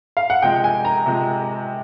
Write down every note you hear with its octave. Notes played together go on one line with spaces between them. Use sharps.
F5
F#5
C3 F3 G#3 G5
G#5
A#5
C3 F3 G#3